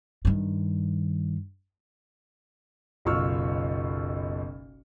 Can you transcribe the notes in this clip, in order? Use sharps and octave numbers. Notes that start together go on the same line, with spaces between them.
G2 D#3
F#1 B1 F4 C#6 E6 F6